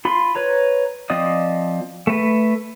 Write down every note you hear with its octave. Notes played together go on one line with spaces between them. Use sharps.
F4 B5 C6
B4 C#5 A#5
F3 C4 D5 D#5 D#6
A3 B4